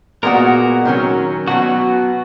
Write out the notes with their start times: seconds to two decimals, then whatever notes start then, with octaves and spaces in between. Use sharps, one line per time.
0.23 A#2 G#3 B3 F#4 A#4
0.85 D#3 F#3 C#4
1.47 B2 F#3 B3 F#4